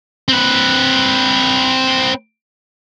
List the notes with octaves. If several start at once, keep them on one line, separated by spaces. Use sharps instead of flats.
C4 B4